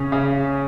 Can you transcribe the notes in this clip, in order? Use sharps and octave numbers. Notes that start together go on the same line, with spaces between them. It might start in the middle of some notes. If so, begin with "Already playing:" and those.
Already playing: C#3 C#4
C#3